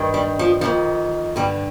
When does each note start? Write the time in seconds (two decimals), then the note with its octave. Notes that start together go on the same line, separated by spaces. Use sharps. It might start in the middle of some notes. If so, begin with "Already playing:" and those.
Already playing: G2 D#3
0.14 G3
0.39 F3
0.61 F2 D#3 F3
1.36 G2 D3 G3